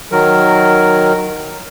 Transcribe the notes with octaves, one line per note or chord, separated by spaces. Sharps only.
D#3 F#3 A#4